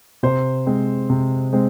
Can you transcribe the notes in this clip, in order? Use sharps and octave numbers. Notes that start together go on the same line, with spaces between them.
C3 C5
G#3 C4
C3
G#3 C4